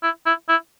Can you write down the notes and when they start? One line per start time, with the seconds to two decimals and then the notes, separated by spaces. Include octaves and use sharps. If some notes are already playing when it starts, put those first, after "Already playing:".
0.03 E4
0.26 E4
0.49 E4